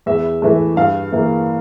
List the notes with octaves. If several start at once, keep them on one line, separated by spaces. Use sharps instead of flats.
E2 E5
E3 A3
G2 F5
E3 A#3